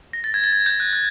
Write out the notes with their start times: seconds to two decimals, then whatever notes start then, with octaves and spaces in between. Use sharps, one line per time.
0.13 A#6
0.24 A6
0.34 G#6
0.44 A6
0.53 G#6
0.66 G6
0.80 F#6
0.93 F#6